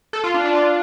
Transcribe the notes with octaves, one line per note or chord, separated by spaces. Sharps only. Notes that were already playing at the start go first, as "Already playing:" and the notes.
A4
F4
D4
D4
F4